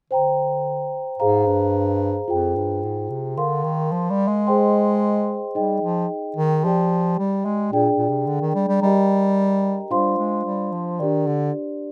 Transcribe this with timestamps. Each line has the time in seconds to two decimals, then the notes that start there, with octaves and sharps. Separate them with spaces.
0.10 D3 C5 G5 A#5
1.19 G#2 G#4 C5 F5 A#5
1.46 G2
2.28 F2 F4 G#4 C5 G5
2.56 G2
2.83 G#2
3.10 C3
3.37 D3 A#4 F5 C6
3.64 D#3
3.92 F3
4.10 G3
4.28 G#3
4.47 G#4 C5 D#5 G5 C6
5.55 G3 D#4 G#4 D#5 G5
5.82 F3
6.37 D#3
6.63 F3 G4 D5 G5
7.19 G3
7.45 G#3
7.72 A#2 D4 G#4 D5 G5
7.98 A#2
8.09 C3
8.27 D3
8.41 D#3
8.55 G3
8.68 G3
8.81 G3 G4 A#4 D#5 G5 A#5
9.91 G3 D4 F4 C5 F5 C6
10.18 G#3
10.45 G3
10.72 F3
10.99 D#3 D4 G4 D5
11.27 D3